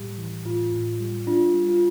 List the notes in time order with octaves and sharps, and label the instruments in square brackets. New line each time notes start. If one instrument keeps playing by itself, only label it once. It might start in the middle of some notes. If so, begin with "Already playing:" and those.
Already playing: [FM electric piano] A2 G3 [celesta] G4
[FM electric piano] E3
[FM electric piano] A2 [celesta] F4
[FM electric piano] A2
G3
[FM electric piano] D4 [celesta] F4
[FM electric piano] G3
[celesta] F4